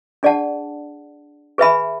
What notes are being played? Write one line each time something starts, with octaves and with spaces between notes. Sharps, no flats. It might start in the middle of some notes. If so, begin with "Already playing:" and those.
D4 G#4 D5 F#5 A5
G#4 B4 E5 G#5 B5